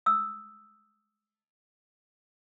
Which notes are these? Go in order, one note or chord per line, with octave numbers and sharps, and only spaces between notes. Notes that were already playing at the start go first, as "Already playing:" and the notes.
D#6 E6